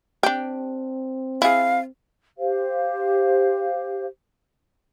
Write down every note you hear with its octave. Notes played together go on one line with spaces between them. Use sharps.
C4 D4 G4
E4 G#4 F5
G4 C5 F5